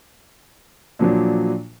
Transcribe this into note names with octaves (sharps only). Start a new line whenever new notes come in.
A#2 F3 F#3 D4